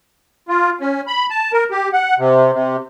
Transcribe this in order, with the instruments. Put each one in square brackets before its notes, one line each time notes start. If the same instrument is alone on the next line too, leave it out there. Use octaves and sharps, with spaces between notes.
[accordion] F4
C#4
B5
A5
A#4
G4
F#5
C3
C3